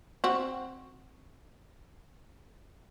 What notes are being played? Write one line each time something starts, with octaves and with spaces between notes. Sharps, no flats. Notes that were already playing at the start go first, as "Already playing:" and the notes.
C4 F#4